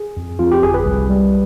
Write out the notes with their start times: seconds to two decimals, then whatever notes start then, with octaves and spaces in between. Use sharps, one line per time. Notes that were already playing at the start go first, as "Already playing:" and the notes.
Already playing: G#4
0.17 F2
0.39 F2 F4
0.52 G4
0.63 G1 G#4
0.74 B4
0.85 C2
1.10 G3